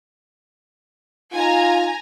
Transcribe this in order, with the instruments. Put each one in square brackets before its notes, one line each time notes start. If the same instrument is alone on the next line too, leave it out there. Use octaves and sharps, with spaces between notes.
[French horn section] D#4 F4 [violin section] G#5 A#5